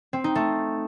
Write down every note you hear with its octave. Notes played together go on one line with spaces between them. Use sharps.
C4
D#4
A3